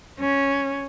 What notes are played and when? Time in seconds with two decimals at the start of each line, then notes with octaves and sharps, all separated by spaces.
0.20 C#4